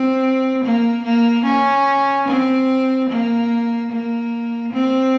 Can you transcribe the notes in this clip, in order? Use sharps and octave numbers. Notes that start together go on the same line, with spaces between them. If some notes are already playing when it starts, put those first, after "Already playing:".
Already playing: C4
A#3
A#3
C#4
C4
A#3
A#3
C4